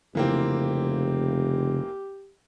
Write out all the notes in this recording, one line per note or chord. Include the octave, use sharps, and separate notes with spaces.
F1 C#3 E3 A#3 C4 G4